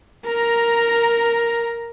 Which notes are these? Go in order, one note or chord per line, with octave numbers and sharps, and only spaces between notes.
A#4 A#5